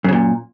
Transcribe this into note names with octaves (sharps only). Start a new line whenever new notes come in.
F#2 A#2 C#3